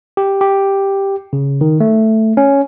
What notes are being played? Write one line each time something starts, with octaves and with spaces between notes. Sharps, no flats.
G4
G4
C#3
D#3
A3
C#4